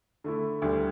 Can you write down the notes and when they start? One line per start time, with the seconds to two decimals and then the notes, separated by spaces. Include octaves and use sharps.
0.24 D3 A3 E4
0.62 D2 D3 G3